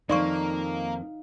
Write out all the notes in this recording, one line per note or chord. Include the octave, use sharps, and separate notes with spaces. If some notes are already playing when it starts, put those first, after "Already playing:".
F2 D#3 A#3 D#4 D5 F5 C6 C#6